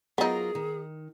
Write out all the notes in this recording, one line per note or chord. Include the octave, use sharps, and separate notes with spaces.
F#3 B3 D#4 F4 G#4 A#4
D#3